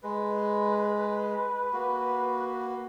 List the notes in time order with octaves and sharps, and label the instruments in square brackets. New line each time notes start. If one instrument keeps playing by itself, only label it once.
[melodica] G#3 [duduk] B4
[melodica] A#3 F#4